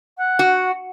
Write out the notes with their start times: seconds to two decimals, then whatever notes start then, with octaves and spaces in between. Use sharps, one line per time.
0.18 F#5
0.39 F#4